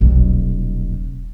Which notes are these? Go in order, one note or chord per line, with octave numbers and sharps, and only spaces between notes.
D#1 B1